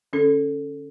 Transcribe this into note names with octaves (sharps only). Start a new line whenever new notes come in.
D3 C#4 A4